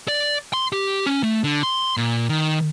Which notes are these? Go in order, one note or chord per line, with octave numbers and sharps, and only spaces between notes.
D5
C6
G4
C#4
A3
D3
C6
A#2
D#3